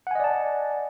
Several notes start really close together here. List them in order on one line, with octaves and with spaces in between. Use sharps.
F#5 G#5 D#5 D5 A5